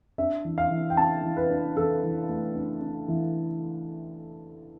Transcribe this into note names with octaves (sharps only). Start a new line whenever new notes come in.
D4 E5
E3
F5
E3
G5
D4 A5
E3
B4
D4
E3 A4
E3
A3
D4
D4
E3